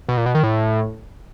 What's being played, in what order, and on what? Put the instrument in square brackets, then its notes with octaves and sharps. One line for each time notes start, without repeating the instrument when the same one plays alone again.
[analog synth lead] B2
A#2
B2
D#3
A2